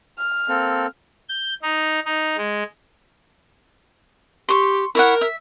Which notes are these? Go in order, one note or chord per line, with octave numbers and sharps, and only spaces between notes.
F6
A#3 C4 A4
G6
D#4
D#4
G#3
G4 C6 C#6
E4 A#4 C#5 F#5
E5